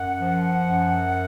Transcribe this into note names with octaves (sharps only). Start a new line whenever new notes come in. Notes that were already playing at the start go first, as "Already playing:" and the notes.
Already playing: F#2 F#5
F3
F#2